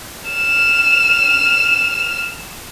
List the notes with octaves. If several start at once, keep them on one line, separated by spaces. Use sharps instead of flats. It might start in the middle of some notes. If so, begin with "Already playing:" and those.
F6 E7